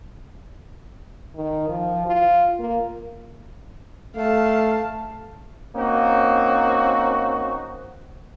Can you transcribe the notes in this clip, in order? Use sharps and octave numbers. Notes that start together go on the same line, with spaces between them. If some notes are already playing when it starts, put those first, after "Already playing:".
D#3
F3
F4
A#3
A3 F5 A5
A#3 C4 C#4 D#4 F#4